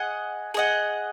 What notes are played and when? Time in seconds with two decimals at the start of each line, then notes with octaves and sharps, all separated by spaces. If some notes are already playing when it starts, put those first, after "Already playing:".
Already playing: G#4 D#5 F#5
0.54 G#4 D#5 F#5